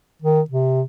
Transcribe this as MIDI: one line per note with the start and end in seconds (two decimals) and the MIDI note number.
0.22 0.41 51
0.50 0.82 48